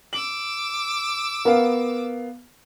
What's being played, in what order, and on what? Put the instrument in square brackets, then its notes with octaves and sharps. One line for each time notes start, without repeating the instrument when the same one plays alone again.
[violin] D6 E6 [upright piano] F#7
[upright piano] B3 F5 [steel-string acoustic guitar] A#4